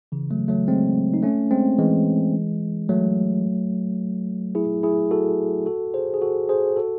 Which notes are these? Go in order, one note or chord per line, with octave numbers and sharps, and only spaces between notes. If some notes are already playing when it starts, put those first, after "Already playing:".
C#3 E3
F#3 A3
F#3 A3
G#3 C4
D#4
A3 C#4
G#3 C4
E3 G#3
F#3 A3
E4 G#4
E4 G#4
F#4 A4
F#4 A4
G#4 C5
G#4
F#4 A4
G#4 C5
F#4 A4